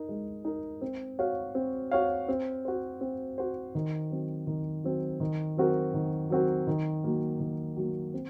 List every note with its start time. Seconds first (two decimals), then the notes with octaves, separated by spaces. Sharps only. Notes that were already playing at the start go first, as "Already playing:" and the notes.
Already playing: D#4 A#4
0.09 G#3
0.45 D#4 A#4
0.81 C4
1.19 F#4 C#5 F5
1.55 C4
1.91 F#4 C#5 F5
2.28 C4
2.65 F#4 C5
3.01 C4
3.38 F#4 C5
3.75 D#3
4.11 F#3 C4
4.47 D#3
4.84 F#3 C4
5.20 D#3
5.57 F#3 C4 F#4 A#4
5.94 D#3
6.30 F#3 C4 F#4 A#4
6.67 D#3
7.04 F#3 A#3
7.40 D#3
7.77 F#3 A#3
8.14 C4